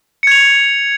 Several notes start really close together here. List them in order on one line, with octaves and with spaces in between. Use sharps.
C#7 G#6 F7